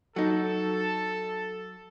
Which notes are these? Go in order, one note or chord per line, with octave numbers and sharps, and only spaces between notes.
F#3 D#4 A4